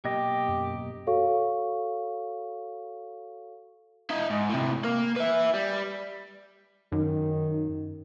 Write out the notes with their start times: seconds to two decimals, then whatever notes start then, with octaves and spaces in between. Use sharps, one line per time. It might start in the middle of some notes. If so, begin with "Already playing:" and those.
0.05 B1 A#3 G4 D#5
0.49 F#2
1.07 F#4 A4 C#5 F5 C#6
4.10 E4 D#5
4.30 G#2
4.50 A2 C3
4.84 A#3
5.16 B4 E5
5.54 G3
6.92 F#2 D#3